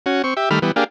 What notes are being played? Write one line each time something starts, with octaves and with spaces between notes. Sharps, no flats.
C#4 F#4
C4 C#6
G4 E5
D#3 G3 A3 B5 F6
E3 G3 B3
A#3 D4 G4 G#4 F5